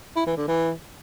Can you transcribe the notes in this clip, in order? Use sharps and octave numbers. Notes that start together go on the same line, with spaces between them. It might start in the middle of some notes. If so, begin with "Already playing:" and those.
E4
E3
D3
E3